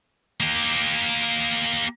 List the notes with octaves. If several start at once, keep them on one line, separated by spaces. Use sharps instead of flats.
A#3 G4